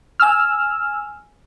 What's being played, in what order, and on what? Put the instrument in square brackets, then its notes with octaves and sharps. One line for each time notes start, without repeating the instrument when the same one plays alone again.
[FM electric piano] G#5 E6 F6